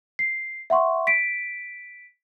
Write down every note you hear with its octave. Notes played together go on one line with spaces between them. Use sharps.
C7
E5 F#5 C6 C#6
B6 D7